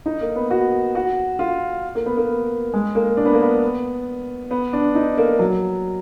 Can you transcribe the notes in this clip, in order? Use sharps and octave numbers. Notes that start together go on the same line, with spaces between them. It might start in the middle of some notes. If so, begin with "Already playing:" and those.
D#4
A#3
B3
F#4
F#4
F4
A#3
B3
A#3
G#3
A#3
D4
B3
A#3
B3
B3
D4
D#4
A#3
F#3